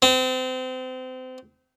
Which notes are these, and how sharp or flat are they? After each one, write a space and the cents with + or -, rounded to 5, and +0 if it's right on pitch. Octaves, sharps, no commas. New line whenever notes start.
C4 -30